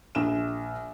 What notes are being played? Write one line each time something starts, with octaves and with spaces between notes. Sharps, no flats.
A#1 E7